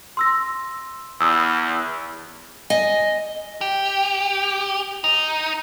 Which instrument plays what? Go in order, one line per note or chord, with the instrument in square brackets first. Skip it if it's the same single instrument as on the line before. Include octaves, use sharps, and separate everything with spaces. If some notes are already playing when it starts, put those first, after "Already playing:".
[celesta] C6 E6 A#6
[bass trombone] E2 [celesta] D#6 E6
[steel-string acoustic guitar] D#5 G#5
[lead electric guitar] G4
D#4